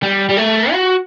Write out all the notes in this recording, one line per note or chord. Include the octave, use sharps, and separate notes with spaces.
G3
G3
A3
F#4